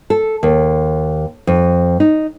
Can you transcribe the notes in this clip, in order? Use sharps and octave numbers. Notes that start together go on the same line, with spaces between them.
A4
D#2
F2
D#4